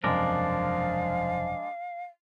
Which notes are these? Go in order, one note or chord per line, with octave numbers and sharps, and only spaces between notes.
E1 F#2 C3 F3 G#3 D4 A#4 F5